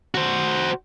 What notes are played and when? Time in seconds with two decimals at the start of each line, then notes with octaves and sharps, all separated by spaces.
0.15 F#4 C5